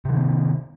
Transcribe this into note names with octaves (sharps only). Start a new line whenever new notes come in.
C3 D#3 E3 B3